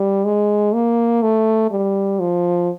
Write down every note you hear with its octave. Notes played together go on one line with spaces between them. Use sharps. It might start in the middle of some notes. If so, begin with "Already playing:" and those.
Already playing: G3
G#3
A#3
A3
G3
F3